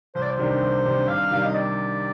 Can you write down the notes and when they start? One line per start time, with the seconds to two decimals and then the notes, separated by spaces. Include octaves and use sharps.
0.15 C2 C5
0.22 D5
0.30 C5
0.38 C3 D#3 G3 D4
0.61 C2
0.85 C3 D#3 G3 D4
1.08 C2 F5
1.31 C3 D#3 G3 D4 F5
1.44 D#5
1.54 D5